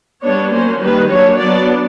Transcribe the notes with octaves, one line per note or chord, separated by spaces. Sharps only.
G3 B3 D4 C#5
F#3 A#3 C#4 C5
D#3 G3 A#3 B4
F#3 A#3 D4 C#5
F#3 B3 D4 D5